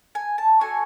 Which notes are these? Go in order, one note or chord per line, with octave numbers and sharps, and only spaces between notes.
G#5
A5
D4 F#4 A4 G#5